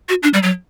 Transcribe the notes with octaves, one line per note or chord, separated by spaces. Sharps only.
F#4
D4
G3
F#3